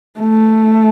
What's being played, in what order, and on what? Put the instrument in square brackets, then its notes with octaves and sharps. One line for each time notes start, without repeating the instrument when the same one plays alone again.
[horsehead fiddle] A3